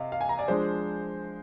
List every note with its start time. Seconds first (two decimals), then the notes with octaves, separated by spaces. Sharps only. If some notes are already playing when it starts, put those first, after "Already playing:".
Already playing: C3 D#5 F5
0.12 F5
0.21 G#5
0.29 A#5
0.39 D5
0.48 F3 G#3 D4 C5